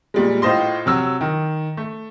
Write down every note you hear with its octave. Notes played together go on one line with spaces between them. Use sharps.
A#2 G3 G#3
A2 F4 C5 D#5 C6
C3 F#3 E6
D#3
A3